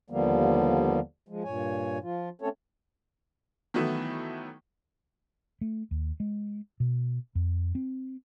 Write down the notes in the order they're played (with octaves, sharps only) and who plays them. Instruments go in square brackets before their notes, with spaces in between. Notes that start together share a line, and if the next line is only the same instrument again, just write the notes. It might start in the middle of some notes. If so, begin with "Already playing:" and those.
[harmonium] D#2 D3 F3 G3 A#3 B3
F3 G#3
G2 A#2 C#5 G#5
F3 F4
A3 C4 C#4 A4 C#5
[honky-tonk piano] D#3 E3 F#3 A3 B3 E4
[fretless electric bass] A3
D#2
G#3
B2
F2
C4